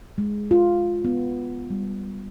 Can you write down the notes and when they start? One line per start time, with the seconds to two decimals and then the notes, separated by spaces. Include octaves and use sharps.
0.18 G#3
0.51 F4
1.05 B3
1.70 G3